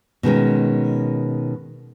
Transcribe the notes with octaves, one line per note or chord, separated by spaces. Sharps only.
B2 D#3 G#3 C#4